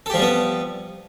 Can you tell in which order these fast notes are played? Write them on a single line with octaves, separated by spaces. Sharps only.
A4 G4 F3 G3 B3